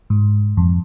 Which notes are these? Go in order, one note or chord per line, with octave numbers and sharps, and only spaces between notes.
G#2
F2